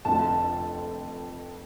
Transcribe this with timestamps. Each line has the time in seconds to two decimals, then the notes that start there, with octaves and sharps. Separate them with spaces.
0.05 F1 F2 D3 A3 A5